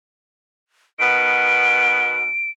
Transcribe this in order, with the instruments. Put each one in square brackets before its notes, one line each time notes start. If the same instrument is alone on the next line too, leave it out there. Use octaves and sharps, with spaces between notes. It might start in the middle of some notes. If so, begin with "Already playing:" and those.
[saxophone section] B2 D#3 B3 [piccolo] D7